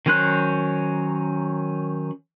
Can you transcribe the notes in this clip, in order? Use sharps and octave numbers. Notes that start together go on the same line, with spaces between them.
D#3 F#3 C#4 C5 F#6